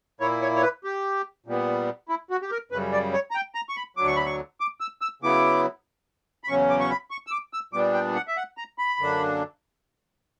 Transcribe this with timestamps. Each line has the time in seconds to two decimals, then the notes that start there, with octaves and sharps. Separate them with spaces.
0.20 A#2 A#3 E4 C#5
0.42 C#5
0.56 C#5
0.62 B4
0.84 G4
1.46 A#2 G3 B3
2.09 E4
2.30 F#4
2.42 G4
2.51 A#4
2.71 F#2 C#3 G3 B4
2.92 D5
3.13 C#5
3.31 A#5
3.35 G5
3.55 A#5
3.69 C#6
3.77 B5
3.97 D2 D3 F#3 D6
4.07 C#6
4.16 B5
4.26 C#6
4.60 D6
4.80 E6
5.02 E6
5.22 C#3 F#3 B3 E4 D6
6.44 B5
6.48 E2 C#3 F#3 C#4 C#6
6.70 D6
6.80 C#6
6.90 B5
7.11 C#6
7.27 E6
7.31 D6
7.53 E6
7.73 A#2 G3 B3 D4 D6
7.94 G5
8.15 F#5
8.28 E5
8.37 F#5
8.57 A#5
8.78 B5
8.99 F#2 D3 A#3 D4